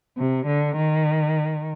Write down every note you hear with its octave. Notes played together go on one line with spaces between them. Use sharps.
C3
D3
D#3